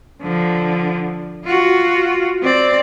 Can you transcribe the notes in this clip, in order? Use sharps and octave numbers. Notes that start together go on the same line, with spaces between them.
D3 F3
F4 F#4
C4 D5